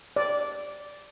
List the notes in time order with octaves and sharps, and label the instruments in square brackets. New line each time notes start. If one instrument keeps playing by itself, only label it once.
[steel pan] D5